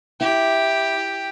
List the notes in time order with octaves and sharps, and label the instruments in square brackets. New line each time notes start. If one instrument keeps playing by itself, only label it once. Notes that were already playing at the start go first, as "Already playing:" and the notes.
[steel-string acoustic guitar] E4 [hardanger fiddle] G4